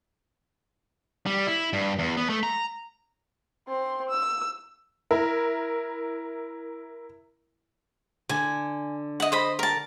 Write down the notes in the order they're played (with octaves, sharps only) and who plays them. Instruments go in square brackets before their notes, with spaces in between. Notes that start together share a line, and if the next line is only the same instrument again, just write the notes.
[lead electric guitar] G3
E4
G2
E2
B3
A3
A#5
[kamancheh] C4 C6
E6
[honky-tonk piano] E4 A#4
[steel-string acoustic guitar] D3 [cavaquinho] G#5
[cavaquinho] D#5 F#5
C5 D#5 B5
A#4 A5